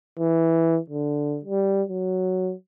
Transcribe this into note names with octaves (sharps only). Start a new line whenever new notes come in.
E3
D3
G3
F#3